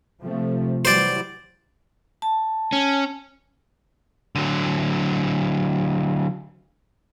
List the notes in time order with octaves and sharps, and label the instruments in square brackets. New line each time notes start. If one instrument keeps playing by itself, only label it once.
[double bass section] C3 F3 A3
[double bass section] E3 F#3 G3 [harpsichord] C5 D5
[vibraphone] A5
[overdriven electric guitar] C#4
D3 F#3